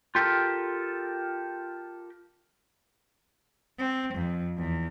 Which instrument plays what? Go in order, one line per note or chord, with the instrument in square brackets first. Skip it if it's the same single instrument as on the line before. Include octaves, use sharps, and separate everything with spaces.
[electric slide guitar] F4 G4 A4 A#4
[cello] C4
F2
E2